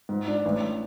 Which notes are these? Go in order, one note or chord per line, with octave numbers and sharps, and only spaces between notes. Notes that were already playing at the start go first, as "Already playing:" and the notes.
G#2
D4
A1